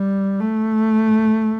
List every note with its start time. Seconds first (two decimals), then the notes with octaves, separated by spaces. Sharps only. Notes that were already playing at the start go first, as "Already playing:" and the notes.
Already playing: G3
0.40 A3